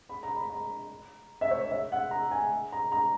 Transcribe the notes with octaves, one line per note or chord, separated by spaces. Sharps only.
B5
A#5
B5
A#5
E5
C#5
C#5
E5
F#5
A#5
G#5
A#5
A#5